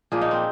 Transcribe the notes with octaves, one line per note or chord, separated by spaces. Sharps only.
A#2 F3 A#3 G#4
D#4
C4